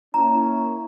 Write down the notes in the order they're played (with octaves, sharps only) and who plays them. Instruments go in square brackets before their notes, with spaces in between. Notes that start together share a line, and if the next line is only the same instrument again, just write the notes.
[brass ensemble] A#3 C#4 E4 [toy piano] A#5